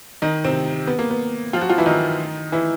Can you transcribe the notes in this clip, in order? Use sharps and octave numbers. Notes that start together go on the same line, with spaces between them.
D#3 D#4
C3 C4
B3
A#3
B3
F3 F4
F#3 F#4
F3 F4
E3 E4
D#3 D#4
E3 E4